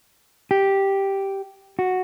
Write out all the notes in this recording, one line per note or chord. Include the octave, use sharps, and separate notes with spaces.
G4
F#4